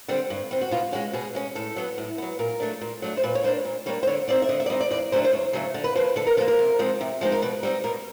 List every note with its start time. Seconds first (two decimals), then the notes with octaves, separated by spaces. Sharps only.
0.08 D3 G3 C4
0.30 G2
0.51 D3 G3 C4
0.61 F#4
0.71 B2 F4
0.92 G#3 C#4 F#4
1.13 B2 G#4
1.35 G#3 C#4
1.55 A2 A4
1.76 F#3 B3
1.98 A2
2.18 F#3 B3
2.39 A#2 A#4
2.60 F#3 A3 D4
2.81 A#2
3.02 F#3 A3 D4
3.17 C5
3.23 A#2 B4
3.35 C#5
3.44 G3 A#3 D4 C5
3.65 A#2
3.86 G3 A#3 D4 C#5
4.03 C5
4.07 D3 C#5
4.28 G3 C4 D#4 D5
4.42 E5
4.49 D3 D#5
4.60 E5
4.66 D5
4.70 G3 C4 D#4 D#5
4.80 D5
4.91 E2 D5
5.12 C#3 F#3 A3 D4 C5
5.24 C5
5.33 E2 C#5
5.53 C#3 F#3 A3 D4
5.74 D3
5.84 B4
5.95 F3 A#3 C5
6.16 D3 A4
6.27 A#4
6.37 F3 A4
6.41 A#3
6.48 A#4
6.59 C3
6.79 F3 G#3 C4 D#4
7.01 C3
7.21 F3 G#3 C4 D#4
7.32 A#4
7.42 B2 B4
7.63 G3 C4 D#4
7.84 B2 A#4